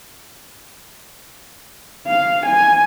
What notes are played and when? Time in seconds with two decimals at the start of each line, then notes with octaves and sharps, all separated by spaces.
2.07 F5
2.46 G#5